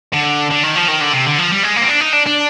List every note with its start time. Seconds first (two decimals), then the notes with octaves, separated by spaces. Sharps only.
0.13 D3
0.50 D3
0.63 D#3
0.76 F3
0.88 D#3
1.01 D3
1.13 C3
1.26 D3
1.38 F3
1.51 G3
1.63 G#3
1.76 A#3
1.82 C4
1.89 D4
2.01 D#4
2.13 D4
2.26 D4